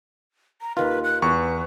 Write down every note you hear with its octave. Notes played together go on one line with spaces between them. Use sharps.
A#5
D#2 D#3 F4 B4
F#6
E2 B4 C#6